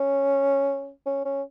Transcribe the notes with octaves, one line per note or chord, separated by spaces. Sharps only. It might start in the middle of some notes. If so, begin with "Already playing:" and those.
Already playing: C#4
C#4
C#4